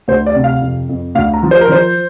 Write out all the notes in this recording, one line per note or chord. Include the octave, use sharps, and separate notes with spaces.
D2 C5
D5
C3
F5
F2
F2
D2 F5
A#5
F3
C5
A#4
F3 C5